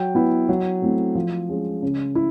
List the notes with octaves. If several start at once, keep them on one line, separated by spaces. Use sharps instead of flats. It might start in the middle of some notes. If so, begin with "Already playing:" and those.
Already playing: F#3 G5
B3 E4
F#3
A3 C4 E4
F3
G#3 C#4
C#3
E4